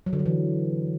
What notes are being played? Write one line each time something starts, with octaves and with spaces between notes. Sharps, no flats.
F#3
D3
F#3
E3